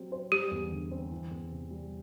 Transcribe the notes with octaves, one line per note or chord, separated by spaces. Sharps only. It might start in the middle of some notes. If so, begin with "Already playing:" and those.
Already playing: F#3 C4 G4
C5
G3 G4
E2
D3
C4
E3
E2
C3
G3